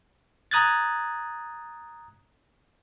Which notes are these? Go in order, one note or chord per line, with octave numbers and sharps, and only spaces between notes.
A#5 D#6 F#6 G#6 A6